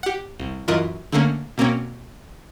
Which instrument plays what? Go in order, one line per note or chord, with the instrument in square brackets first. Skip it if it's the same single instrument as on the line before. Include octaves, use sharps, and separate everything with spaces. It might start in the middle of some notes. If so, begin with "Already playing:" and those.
[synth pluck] G4 F#5
C2
F#2 E3 F4 A#4 D#5 F#6
D3 A3 A#3 C#4
B2 A#3 C4 C#4